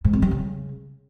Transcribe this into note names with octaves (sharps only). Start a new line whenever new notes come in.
G#2
F2
G3
C#3